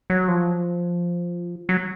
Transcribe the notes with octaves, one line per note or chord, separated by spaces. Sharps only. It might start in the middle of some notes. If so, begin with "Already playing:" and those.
F#3
F3
F#3